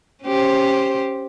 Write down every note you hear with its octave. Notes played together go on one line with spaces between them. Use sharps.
C#4 G4 C5